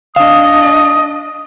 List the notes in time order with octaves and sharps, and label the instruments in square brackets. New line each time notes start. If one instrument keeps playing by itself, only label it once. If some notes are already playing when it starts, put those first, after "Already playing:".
[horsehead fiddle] D4 D#5 [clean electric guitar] F5 [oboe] D#6